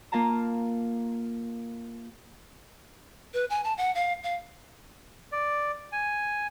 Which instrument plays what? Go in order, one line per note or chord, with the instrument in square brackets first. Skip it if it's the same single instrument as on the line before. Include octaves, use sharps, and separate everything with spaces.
[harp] A#3 F4 F5 A5 A#5
[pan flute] B4
G#5
A5
F#5
F5
F5
[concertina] D5
G#5